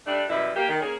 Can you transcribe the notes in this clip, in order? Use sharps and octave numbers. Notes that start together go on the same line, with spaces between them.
G3 A3 D4
F#2 B2 G3 E4 B4
A#3 G4
D#3
A#3 C#4 G#4